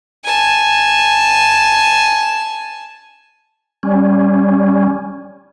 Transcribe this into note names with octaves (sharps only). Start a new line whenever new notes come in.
G#5 A5
G3 C#4